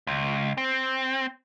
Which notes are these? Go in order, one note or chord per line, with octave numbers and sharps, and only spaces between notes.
C#2
C4